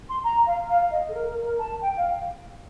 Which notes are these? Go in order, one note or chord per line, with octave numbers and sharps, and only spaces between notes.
C6
A#5
F5
F5
D#5
A4
A#4
A#4
A#4
A5
G5
F5